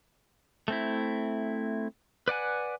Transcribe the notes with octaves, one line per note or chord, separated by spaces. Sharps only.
A3 C4 E4
B4 D5 F#5 G#5